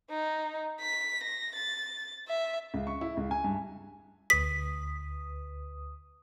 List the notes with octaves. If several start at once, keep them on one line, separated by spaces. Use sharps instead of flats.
D#4
B6
A#6
A6
E5
C#2
C#6
E4
C#2
G#5
G2
D2 B4 D#6 B6